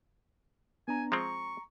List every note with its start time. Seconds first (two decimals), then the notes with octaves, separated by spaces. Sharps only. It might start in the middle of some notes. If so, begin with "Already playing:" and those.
0.88 B3 D4 G#5 A#5
1.12 F3 G#3 C4 A#5 C#6